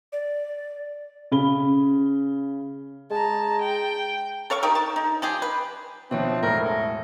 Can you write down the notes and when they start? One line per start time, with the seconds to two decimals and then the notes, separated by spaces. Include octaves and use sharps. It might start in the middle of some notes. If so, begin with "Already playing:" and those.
0.13 D5
1.31 C#3 B5 G7
3.10 G#3 A5 A#5
3.60 G5
4.50 A4 C#5 F5 C#6
4.63 A3 D#4 G4 A#4
4.75 A5
4.96 D#4
5.22 F3 G4 G#4
5.42 B4
6.11 B2 F3 C4 C5 C#5 E5
6.43 E1 A2 A#4 E5
6.65 A4